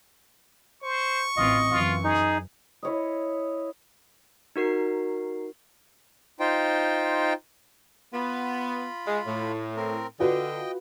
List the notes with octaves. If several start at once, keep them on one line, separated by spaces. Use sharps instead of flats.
C5 C#6
A1 E3 C4 F4 D#5
F#2 E3 F4
D#4 G#4
E4 C#5 D#5
D#4 F#4 A#4 C7
D#4 F4 C5 G5
B3 F4 B5
G#3
A2
C4 A#4
D3 F4 F#4 B4 D#5 G5